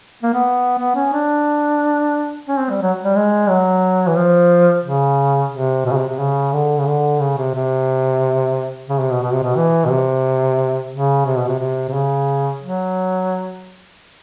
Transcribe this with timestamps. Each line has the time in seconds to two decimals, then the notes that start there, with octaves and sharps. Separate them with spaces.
0.23 A#3
0.34 B3
0.79 B3
0.96 C#4
1.13 D4
2.48 C#4
2.59 C4
2.70 G3
2.82 F#3
3.05 G3
3.16 G#3
3.49 F#3
4.08 E3
4.16 F3
4.84 C#3
5.52 C3
5.86 B2
5.92 C#3
5.96 C3
6.08 C3
6.19 C#3
6.53 D3
6.79 C#3
6.87 D3
7.20 C#3
7.38 C3
7.55 C3
8.89 C#3
9.00 C3
9.11 B2
9.23 B2
9.33 C3
9.44 B2
9.57 E3
9.85 B2
9.90 C3
10.92 C#3
11.26 C3
11.37 B2
11.48 C3
11.60 C3
11.89 C3
11.93 C#3
12.61 F#3